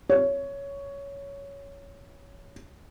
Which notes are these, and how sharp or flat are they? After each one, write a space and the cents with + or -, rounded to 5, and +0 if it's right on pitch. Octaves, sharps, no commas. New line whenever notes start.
C#5 +10